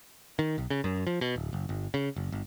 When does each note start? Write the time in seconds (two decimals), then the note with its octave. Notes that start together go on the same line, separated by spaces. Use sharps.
0.39 D#3
0.58 B1
0.70 C#3
0.84 F#2
1.07 F3
1.21 B2
1.36 D1
1.53 F#1
1.69 G1
1.94 C#3
2.16 F#1
2.32 G1